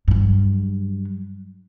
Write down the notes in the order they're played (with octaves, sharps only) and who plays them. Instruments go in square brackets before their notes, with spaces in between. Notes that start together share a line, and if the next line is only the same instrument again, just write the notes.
[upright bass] G2 F#3